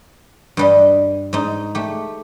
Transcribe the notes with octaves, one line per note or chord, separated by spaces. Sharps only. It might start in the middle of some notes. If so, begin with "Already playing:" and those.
G2 G3 D#5
G#2 D#4
A3 G4